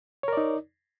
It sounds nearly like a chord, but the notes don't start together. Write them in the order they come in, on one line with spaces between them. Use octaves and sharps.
C#5 A#4 D5 D#4